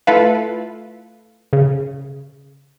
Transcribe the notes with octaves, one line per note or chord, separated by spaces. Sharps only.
A3 E4 F4 A4 B4 F5
C#3